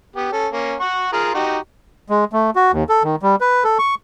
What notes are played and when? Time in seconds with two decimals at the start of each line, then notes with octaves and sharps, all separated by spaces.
0.16 B3 G4
0.32 C#4 A4
0.53 A#3 C#4
0.80 F#5 C#6
1.13 F4 G#4 A#4
1.34 D#4 F#4 G4
2.10 G#3
2.33 A3
2.56 F#4
2.72 D#2
2.89 A4
3.03 D#3
3.22 G3
3.41 B4
3.64 A4
3.79 C#6